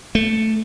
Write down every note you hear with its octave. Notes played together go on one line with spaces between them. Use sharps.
A3